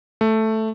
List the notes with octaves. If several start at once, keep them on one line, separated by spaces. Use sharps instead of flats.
A3